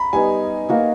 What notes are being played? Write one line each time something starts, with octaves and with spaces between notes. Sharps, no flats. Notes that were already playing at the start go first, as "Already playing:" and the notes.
Already playing: A#5 B5
G3 B3 D#4 G#5
A#3 D#4 F#4